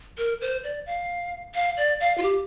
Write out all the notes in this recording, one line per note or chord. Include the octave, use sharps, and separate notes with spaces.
A#4
C5
D5
F5
F5
D5
F5
F4
G4